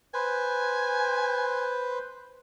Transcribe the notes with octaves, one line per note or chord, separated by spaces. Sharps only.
B4 C5 G#5